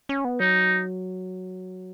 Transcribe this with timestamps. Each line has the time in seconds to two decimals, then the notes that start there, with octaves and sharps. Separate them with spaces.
0.09 C#4
0.25 B3
0.40 F#3 D#4